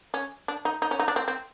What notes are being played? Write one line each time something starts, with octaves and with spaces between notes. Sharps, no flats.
C#4
D4
D#4
D#4
C#4
D#4
D4
C4
C4